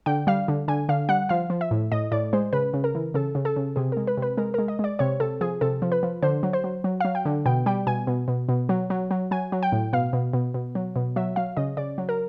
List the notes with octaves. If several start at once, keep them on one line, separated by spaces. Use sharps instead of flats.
D3 G5
G3 F5
D3
D3 G#5
D3 F5
G3 F#5
F3 F5
F3
E5
A2
A2 D#5
A2 D5
G#3 C5
C#3 B4
C#3
A#4
E3
C#3 A4
C#3
A4
C#3
C3 G#4
G#3 A#4
B4
C3 B4
G#3 A#4
G#3 A#4
D#5
G#3 D5
C3 C#5
C3 A4
F3 G#4
C3 A4
F3
B4
F3
D3 C5
F#3
C5
F#3
F#3
F#3 F5
G5
D3
B2 G5
G3 G5
B2 G#5
B2
B2
B2
F#3
F#3
F#3
F#3 G#5
F#3
G5
A2
B2 F5
B2
B2
B2
F#3
B2
F#3 E5
F#3 F5
C#3 D#5
C#3 D5
F#3
A#4